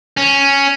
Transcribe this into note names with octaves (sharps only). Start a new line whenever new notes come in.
C#4